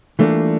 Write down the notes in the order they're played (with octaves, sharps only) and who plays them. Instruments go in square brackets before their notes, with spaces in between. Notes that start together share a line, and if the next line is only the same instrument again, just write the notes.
[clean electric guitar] E3 G3 A#3 D4 F4 [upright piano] A3